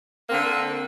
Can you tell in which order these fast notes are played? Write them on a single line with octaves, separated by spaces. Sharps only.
A#3 C4 D3